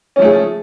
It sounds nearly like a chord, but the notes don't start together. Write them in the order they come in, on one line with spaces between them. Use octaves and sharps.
C#4 F3 A3 G#4